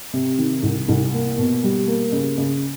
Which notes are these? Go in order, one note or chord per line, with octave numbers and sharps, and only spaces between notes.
C3
D#3
C2
C2
A#3
B2
G3
A#3
C#3
C#3